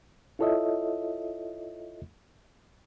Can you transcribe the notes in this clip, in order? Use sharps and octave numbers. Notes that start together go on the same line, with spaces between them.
E4 F4 A4 C#5 D#5 E5